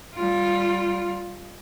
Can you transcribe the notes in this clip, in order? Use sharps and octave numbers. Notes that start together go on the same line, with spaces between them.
G3 F4